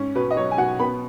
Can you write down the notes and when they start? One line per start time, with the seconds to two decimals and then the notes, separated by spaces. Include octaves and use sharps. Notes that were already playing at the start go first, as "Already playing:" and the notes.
Already playing: G#2 C#4
0.15 B2 B4
0.31 D#5
0.37 F#3 C#5
0.51 G#5
0.58 B2 F#5
0.79 B3 B5